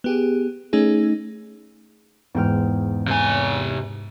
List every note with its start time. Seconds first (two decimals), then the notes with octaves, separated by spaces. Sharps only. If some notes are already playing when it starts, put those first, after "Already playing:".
0.04 B3 G4 G#4
0.73 A3 C#4 D#4 G#4
2.35 E2 G#2 G#3 G5 F6
3.08 C3 G#5